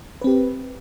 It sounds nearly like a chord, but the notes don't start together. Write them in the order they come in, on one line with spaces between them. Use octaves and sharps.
B4 C4 G4